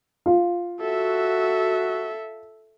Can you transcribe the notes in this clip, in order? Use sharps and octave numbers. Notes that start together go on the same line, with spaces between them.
F4
F#4 A4 E5